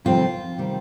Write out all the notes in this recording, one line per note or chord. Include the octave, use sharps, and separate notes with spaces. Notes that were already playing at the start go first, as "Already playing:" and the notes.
F2 C3 D#3 G3 C4 F4
C3 D#3 G3 C4